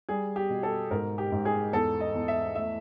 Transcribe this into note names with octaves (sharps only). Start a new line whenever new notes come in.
G3 G#4
G4
B2
A4
G#2 A#4
G4
G#2
G#4
E2 A4
D#5
E2
E5
A3 E5